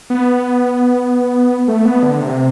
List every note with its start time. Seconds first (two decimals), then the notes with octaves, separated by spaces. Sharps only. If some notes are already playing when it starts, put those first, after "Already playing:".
0.10 B3
1.68 A3
1.85 B3
2.03 D3
2.21 C3